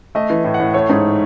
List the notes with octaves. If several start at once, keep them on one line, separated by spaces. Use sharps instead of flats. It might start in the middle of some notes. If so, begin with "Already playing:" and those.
A3 D#5
E3
A2
F#5
A2
A3 C#5
G#2